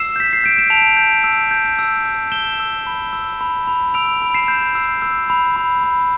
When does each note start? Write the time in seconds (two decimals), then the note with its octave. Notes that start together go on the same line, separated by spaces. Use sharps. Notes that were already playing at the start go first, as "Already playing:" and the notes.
Already playing: E6 C7 E7
0.16 G6 B6
0.33 C7
0.44 G6 D7
0.58 E7
0.70 A5 D7 F7
0.97 G6
1.24 E6
1.51 G6
1.79 E6
2.06 G6
2.32 G6 E7 G7
2.60 E6
2.87 B5
3.13 E6
3.41 B5
3.67 B5
3.94 E6 D7 F7
4.22 B5
4.34 C7 E7
4.48 G6
4.75 E6
5.02 E6
5.30 B5
5.56 B5
5.83 B5